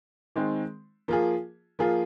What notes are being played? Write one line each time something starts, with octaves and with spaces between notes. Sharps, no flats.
D#3 G#3 C4
F3 A#3 F4 G#4
F3 A#3 F4 G#4